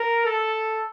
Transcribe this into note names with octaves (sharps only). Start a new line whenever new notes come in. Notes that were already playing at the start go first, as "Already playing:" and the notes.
Already playing: A#4
A4